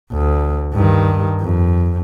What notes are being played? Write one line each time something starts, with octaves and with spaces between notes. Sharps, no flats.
D2
G2 D#3
F2